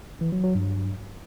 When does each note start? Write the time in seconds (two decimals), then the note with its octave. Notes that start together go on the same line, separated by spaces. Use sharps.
0.21 E3
0.32 F#3
0.44 F#3
0.55 G2